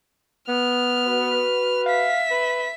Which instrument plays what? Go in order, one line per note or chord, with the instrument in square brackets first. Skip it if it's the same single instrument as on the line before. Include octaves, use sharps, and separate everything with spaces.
[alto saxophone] B3 [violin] F6
[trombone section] F#4 B4
[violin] E5 B6 [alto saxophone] F5
[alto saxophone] B4